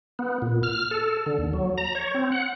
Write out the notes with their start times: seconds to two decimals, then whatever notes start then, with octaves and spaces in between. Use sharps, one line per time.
0.19 B3
0.42 A#2
0.63 F6
0.91 A4
1.26 D3
1.38 D#2
1.53 F#3
1.78 A#5
1.95 C#5
2.14 C4
2.32 F#5